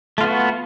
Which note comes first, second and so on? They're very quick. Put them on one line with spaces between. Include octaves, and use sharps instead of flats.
A3 F4 B3 F#4